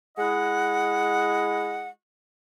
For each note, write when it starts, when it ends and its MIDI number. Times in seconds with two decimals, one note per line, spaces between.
0.17 1.88 56
0.17 1.88 64
0.17 1.88 75
0.17 1.88 78